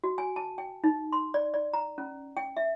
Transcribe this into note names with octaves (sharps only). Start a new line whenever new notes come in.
F#4
G#5
A5
G5
D#4
C6
D5
D5
A#5
C#4
G5
E5